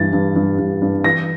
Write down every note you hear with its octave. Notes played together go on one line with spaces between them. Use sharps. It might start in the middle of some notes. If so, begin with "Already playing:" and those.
Already playing: G2 E3 A6
G2
G2
G2
G2
E3 A#6